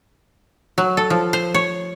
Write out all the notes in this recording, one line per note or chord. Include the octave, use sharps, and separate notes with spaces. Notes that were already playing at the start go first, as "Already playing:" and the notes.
F#3
A4
F3
C5
C#5